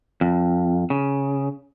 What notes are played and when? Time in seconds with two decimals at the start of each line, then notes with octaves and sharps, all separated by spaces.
0.21 F2
0.90 C#3